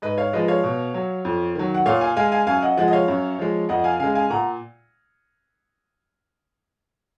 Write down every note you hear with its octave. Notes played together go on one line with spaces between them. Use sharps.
G#2 B4 D#5
C#5 F5
F3 G#3 B4 D#5
C#5 F5
B2
F#3
F2
D#3 F#3
F#5
A#2 C#5 F5
F5 G#5
G#3 F5 G#5
F5 G#5
F#2 F5 G#5
D#5 F#5
F3 G#3 D#5 F#5
D#5
C#5 F5
F#2
F3 G#3
F2 D#5 F#5
F#5
F5 G#5
C#3 G#3 F5 G#5
F5 G#5
A#2 F#5 A#5